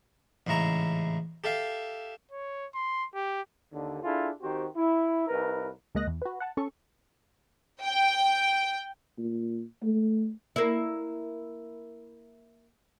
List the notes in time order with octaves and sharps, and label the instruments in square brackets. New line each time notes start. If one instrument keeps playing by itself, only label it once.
[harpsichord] A1 G#2 C#3 E4 A#5 C#6
G4 A4 E5 F5
[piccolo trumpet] C#5
C6
G4
[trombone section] D#2 D3
D4 E4 F4 G#4 A4
D#3 C4 F#4 G4 C5
E4
C2 D#4 A#4 B4
[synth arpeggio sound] C#2 G#3 A#3 D#5 F#6 A#6
E2
F#4 B4
F#5 A5
C#4 A4 C#6
[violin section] G5
[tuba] A#2
A3
[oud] A#3 E4